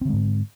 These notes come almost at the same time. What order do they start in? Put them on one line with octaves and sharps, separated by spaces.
C4 D3 G#3 G#2